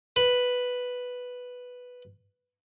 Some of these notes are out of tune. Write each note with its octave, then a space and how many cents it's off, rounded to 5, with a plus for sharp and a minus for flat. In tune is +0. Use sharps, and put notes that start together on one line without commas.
B4 +0